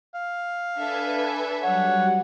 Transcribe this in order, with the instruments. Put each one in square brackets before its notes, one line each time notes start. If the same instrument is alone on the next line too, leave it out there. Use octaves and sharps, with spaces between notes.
[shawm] F5
[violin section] D4 A4 E5 [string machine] B4 G#5
[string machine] F#3 G3 [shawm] C#5 [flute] F#5